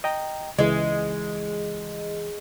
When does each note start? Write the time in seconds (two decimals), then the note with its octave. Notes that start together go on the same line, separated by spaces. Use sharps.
0.04 D#5 G5 A#5
0.59 C#2 E3 G#3